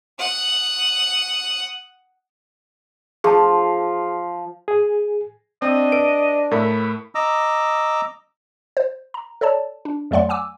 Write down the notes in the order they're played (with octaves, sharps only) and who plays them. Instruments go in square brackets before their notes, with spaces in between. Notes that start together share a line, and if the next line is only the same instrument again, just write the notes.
[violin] F#5 D#6
[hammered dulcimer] F3 [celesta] G#4 A5
[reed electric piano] G#4
[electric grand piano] C4 [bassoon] D4 [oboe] D#5
[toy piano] B4 [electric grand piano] D7
[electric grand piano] A2 A3 [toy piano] E4 A#4 F5 [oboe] B5
[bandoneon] D#5 A#5 D6 E6
[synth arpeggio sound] C5
A#5
A4 C#5 D5 A5
D4
F2 F#3 A3 D5 F#5 C6
F#5 G#5 D6 E6